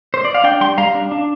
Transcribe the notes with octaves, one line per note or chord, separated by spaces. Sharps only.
C5
D5
F5
D4 D5 G5
G3 G5 C6
G3 F5 A#5
D4
D4